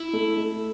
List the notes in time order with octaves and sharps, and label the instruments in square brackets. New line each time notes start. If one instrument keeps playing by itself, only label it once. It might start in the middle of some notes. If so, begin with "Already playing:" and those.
Already playing: [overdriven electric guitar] E4
[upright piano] A3
A3